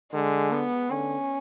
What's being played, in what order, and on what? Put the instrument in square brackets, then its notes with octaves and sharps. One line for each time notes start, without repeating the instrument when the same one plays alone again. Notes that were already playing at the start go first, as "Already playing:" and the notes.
[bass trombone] D3 [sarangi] G#3
[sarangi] B3
[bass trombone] D3 [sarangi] C#4